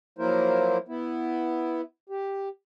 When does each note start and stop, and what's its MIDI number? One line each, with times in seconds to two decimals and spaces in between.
0.19 0.78 53
0.19 0.78 54
0.19 0.78 58
0.19 0.78 64
0.19 0.78 70
0.19 0.78 72
0.88 1.81 59
0.88 1.81 64
2.09 2.49 67